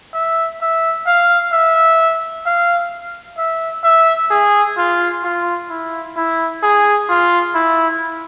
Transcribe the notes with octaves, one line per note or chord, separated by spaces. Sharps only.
E5
E5
F5
E5
F5
E5
E5
G#4
F4
F4
E4
E4
G#4
F4
E4